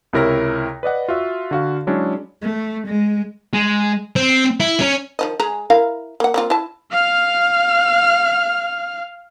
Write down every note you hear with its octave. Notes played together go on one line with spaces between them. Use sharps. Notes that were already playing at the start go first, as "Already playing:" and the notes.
C#2 C3 E4 A#4 C#5 A#6
B4 D5 D#5 F#5
F4 F#4 E5
D3 F#4 F5
F#3 G#3 C#4 D4 E4
A3
G#3
G#3
C4
E4
C#4
D#3 F3 D#5
G#3 G#4 A#5
E4 A#4 F5
A#3 F#5
A#3 C4 F4
E4 A5
F5 F6